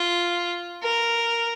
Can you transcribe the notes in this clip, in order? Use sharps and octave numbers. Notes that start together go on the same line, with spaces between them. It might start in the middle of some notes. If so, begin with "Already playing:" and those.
Already playing: F4
A#4